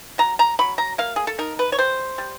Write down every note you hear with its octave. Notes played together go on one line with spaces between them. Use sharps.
F#3 A#5
A#5
F#3 B5
A#5
A#3 F5
G#4
A4
D#4 A#4
B4
C#5
G3 C5
G3